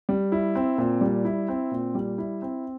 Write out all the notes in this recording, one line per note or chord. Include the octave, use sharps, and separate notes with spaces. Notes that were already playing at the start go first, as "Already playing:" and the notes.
G3
E4
C4
A#2
G3
E4
C4
A#2
G3
E4
C4